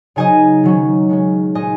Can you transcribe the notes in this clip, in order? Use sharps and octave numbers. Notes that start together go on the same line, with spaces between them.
C#3 F#3 D#4 D#5 G#5
D#3 F#3 C#4
D#3 G#3 C#4
A#2 G#3 D#4 D#5 G#5